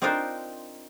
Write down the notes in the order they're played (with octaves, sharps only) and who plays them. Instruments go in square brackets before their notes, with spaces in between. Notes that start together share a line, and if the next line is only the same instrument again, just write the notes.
[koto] C4 D4 D#4 F4 A#4 C5